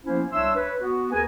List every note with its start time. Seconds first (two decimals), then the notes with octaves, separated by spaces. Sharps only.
0.05 F3 A#3 B3 C#4 E4 C5
0.32 C2 D4 C#5 E5 C6 E6
0.56 B4 C#5
0.81 B3 F#4
1.12 D#2 G#4 A#4 B4 G#5